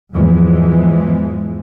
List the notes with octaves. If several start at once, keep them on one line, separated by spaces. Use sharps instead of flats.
E2 G#2 E3 F3 G#3